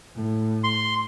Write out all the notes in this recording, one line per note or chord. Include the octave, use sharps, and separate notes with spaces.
A2
C6